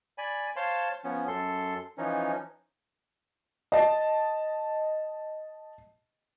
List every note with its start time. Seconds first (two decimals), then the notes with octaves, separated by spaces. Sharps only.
0.18 D5 G#5 B5
0.56 C5 C#5 F5 A5 C6
1.04 F3 B3 C#4
1.28 F#2 A4 C6
1.98 E3 F3 C#4 D#4
3.72 D#5 A5